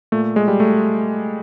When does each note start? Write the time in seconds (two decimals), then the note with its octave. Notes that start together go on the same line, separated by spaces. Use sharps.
0.12 A#2 A3
0.36 G#3
0.48 G3
0.60 A3